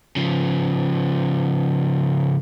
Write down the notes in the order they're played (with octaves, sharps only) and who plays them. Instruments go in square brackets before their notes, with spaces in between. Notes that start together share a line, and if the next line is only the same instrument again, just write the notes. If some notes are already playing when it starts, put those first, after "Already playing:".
[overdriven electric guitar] C#3 F3